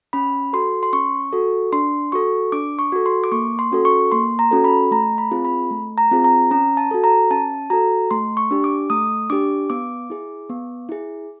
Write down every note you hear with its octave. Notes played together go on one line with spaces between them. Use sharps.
C#4 B5
F#4 A4 C6
C6
C#4 C#6
F#4 A4
D4 C6
F#4 A4 C#6
D4 D6
C#6
F#4 A4
C6
D6
A#3 C#6
C6
C#4 F#4 A4
C#6
A#3 C6
A#5
C#4 F#4 A4
B5
A3 A#5
B5
C4 F4 G#4
B5
A3
A#5
C4 F4 G#4
A#5
C#4 A#5
A5
F#4 A4
A#5
C#4 A5
F#4 A4 A#5
A3 C6
C#6
D4 G4
D6
A3 D#6
D4 G4 D6
B3 D6
E4 G#4
B3
E4 G#4